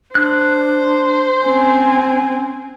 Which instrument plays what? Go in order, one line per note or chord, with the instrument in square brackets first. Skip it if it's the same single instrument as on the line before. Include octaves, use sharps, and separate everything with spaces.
[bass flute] D4 [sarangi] C5 [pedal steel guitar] F#6
[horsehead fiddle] C4 G#5 [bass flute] C#4